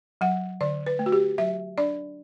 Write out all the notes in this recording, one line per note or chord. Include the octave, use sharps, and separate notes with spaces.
F#3 F#5
D3 D5
B4
A3
F#4
G4
F#3 E5
D4 D5